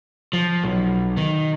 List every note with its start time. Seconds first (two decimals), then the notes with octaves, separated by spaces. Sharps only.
0.33 F3
0.64 B1
1.17 D#3